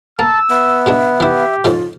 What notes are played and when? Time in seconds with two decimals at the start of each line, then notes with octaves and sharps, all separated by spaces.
0.19 A#3 A5 E6
0.50 B3 E5
0.86 B2 G#3 D4
1.20 E3 E4 G4
1.64 F2 G#2 C#3 F4